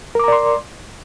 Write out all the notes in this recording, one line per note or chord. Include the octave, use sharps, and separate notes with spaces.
A#4 D5 A#5 C6 D6